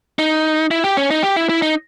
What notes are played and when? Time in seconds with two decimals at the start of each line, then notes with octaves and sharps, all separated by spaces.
0.19 D#4
0.71 E4
0.84 G4
0.97 C#4
1.11 D#4
1.23 G4
1.36 E4
1.49 E4
1.62 D#4